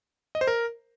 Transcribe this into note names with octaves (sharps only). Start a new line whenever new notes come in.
D#5
C5
A#4